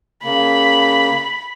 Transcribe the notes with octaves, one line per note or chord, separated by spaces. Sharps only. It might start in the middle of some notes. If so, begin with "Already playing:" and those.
C#3 A#3 B5